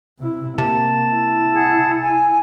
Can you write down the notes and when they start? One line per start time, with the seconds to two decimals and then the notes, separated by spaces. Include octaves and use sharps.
0.19 C3 E4
0.58 C3 A#3 A5
1.13 E4
1.53 G#4 F#5
2.02 G#5